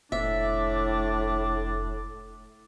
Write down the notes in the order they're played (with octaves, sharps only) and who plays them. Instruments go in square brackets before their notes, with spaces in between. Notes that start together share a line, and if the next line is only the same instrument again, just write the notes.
[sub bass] F1 [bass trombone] A2 [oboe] D4 [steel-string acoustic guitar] E5